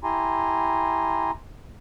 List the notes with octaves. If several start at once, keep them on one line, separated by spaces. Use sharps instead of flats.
E4 G4 G#5 A#5 C6